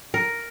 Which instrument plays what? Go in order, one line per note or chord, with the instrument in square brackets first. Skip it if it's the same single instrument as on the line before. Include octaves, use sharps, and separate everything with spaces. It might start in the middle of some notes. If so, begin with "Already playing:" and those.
[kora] A#4